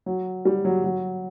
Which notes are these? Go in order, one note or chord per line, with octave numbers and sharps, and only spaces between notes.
F#3
G3
F#3
F#3